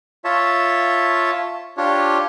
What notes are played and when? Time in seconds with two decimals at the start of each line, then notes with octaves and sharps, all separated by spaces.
0.25 F4 C#5 E5 A5
1.77 D4 F4 G4 C#5